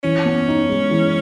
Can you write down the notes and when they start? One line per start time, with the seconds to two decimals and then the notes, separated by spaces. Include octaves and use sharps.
0.03 E3 C#4
0.25 B3
0.48 D#4
0.69 G#3
0.91 E3